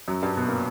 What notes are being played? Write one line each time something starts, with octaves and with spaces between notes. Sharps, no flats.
F#2 F#3
G2 G3
B2 B3
A#2 A#3